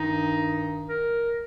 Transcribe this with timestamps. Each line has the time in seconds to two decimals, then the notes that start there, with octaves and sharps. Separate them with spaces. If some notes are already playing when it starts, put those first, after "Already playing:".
Already playing: G2 D#3 D#4
0.89 A#4